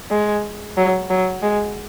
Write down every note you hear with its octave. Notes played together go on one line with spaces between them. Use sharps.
G#3
F#3
F#3
G#3